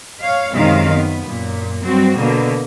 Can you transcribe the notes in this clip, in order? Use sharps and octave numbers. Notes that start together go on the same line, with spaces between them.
C#5 F5
F#2 C3 D#3 G#3 F5
B3
F#2 A#2
G2 F#3 C4 F#4
B2 D3 A#3